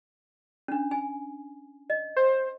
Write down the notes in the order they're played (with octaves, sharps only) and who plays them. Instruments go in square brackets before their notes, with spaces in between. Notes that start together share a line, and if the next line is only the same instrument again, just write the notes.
[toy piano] C#4 D4
G#5
D#5
[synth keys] C5